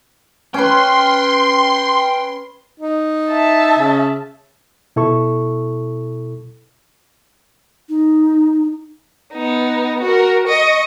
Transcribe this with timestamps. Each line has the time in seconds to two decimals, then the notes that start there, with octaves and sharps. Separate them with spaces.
0.54 C#4 B4 G5 C6
2.80 D#4
3.30 E5 A5
3.79 C#3
4.96 B2 E4 A4 C#6
7.89 D#4
9.33 B3 D#4
10.02 F#4 A#4
10.47 D#5 C#6